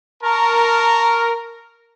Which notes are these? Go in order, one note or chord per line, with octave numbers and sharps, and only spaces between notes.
A#4 A5 A#5 C#6